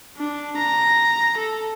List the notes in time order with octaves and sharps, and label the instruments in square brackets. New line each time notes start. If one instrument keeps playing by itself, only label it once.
[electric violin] D4
A#5
A4